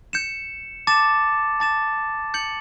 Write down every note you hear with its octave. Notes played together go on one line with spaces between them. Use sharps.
G6 C#7 E7
A5 D6 A6 E7
A5 D6 A6 E7
G6 C#7 F#7